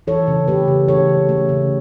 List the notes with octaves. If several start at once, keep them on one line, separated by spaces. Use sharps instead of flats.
E3 A4 C#5
C#3
A3 G4 B4
C#3
E3 A4 C#5
C#3
A3
C#3